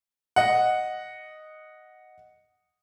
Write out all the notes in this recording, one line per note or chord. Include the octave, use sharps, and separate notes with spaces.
D#5 F#5